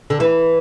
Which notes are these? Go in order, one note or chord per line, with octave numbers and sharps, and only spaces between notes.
D3
E3